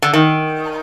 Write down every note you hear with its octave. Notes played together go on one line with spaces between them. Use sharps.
D3
D#3